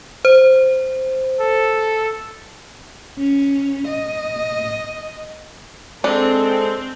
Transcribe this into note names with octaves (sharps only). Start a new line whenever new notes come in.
C5
A4
C#4
D#5
G#3 C4 D4 A4